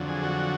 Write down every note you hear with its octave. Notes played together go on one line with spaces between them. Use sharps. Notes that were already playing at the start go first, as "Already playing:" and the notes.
Already playing: F2 D3 F#3
G#4
F#4